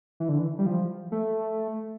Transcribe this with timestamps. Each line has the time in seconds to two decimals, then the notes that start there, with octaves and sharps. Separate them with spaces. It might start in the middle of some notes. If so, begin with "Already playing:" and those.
0.20 E3
0.29 D3
0.39 E3
0.59 G3
0.66 F3
1.12 A3